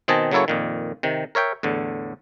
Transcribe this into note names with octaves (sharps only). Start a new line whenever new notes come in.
B2 D#3 C4 D#5 G#5 A5
C#3 F#3 A#3 E4 A4 C#5
F2 A#2 D#3
C3 D#3
A#4 C#5 E5 G5
E2 A2 D3